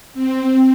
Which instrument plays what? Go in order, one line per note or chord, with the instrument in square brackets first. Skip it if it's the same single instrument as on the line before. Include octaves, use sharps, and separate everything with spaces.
[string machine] C4